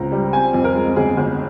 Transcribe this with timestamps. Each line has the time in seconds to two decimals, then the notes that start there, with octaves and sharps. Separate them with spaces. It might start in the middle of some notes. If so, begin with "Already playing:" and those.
Already playing: C#2 C4 A#5
0.12 G3
0.33 C4 G#5
0.54 F2
0.64 A#4
0.75 G#3
0.96 G1 G#4
1.17 G1